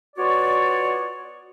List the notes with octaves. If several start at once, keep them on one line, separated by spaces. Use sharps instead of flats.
B3 F4 F#4 C#5 D5